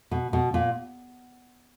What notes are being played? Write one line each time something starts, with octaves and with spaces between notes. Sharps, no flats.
B2
B2
A#2